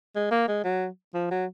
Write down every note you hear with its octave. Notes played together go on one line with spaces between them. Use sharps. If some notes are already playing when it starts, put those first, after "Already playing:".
G#3
A#3
G#3
F#3
F3
F#3